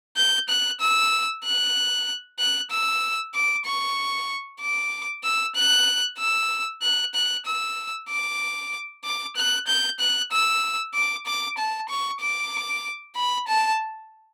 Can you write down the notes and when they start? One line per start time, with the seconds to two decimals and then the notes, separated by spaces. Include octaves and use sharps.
0.17 G6
0.49 F#6
0.80 E6
1.44 F#6
2.39 F#6
2.71 E6
3.34 D6
3.66 C#6
4.60 D6
5.24 E6
5.56 F#6
6.18 E6
6.83 F#6
7.15 F#6
7.46 E6
8.09 D6
9.04 D6
9.36 F#6
9.67 G6
10.00 F#6
10.32 E6
10.94 D6
11.26 D6
11.58 A5
11.89 C#6
12.21 D6
13.16 B5
13.48 A5